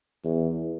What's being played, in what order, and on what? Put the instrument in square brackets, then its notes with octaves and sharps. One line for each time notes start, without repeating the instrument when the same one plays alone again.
[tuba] E2